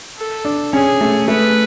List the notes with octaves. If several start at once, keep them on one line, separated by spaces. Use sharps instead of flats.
A4
D4
C#4 G#4
A3
A3 B4